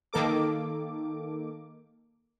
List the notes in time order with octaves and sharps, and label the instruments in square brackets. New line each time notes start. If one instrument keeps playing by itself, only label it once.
[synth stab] D#3 A#3 A4 D6